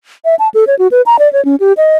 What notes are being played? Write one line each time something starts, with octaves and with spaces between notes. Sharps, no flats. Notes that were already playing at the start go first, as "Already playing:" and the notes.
E5
A5
A4
C#5
F#4
B4
A#5
D5
C#5
C#4
G4
D#5